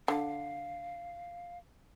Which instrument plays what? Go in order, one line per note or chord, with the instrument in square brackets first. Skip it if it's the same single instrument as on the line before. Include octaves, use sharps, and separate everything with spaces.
[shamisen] D3 [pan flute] F5